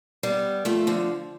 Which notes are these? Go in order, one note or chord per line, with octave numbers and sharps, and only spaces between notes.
G3 B3
F3 A3
D3 F3